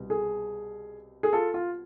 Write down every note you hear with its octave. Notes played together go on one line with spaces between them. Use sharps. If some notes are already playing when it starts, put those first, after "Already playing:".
Already playing: C2 B2 B3
G#4
G#4
F4 A4
F4